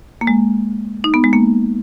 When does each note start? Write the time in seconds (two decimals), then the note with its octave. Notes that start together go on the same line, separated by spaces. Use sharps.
0.21 A#3
0.27 G#3
1.04 D#4
1.14 B3
1.24 G#3
1.33 A#3